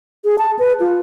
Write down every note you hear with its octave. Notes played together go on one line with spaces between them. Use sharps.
G#4
A5
B4
F4